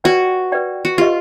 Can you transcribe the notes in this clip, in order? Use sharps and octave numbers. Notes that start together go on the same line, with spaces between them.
F#4 B4 D5 G5
B4 D5 G5
F#4
F4 G4 B4 D#5